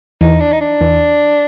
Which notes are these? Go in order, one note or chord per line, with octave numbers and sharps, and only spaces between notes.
E2 E3 D#4
D4
D#4
D4
E2 E3